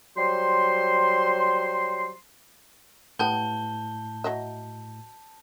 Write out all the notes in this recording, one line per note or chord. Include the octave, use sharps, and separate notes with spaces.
F#3 G3 C5 C6
A2 G3 B3 G5 A5 G6 G7
F#3 D#5 E5